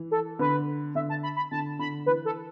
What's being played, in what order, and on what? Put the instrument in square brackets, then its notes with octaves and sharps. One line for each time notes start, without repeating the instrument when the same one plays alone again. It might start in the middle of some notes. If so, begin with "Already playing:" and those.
Already playing: [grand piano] E3
[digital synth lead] A4
[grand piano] D3 [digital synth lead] B4
[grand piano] D3 [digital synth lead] E5
[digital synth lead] A5
B5
B5
[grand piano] D3 [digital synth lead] A5
[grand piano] D3 [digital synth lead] B5
[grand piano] E3 [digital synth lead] B4
[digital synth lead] A4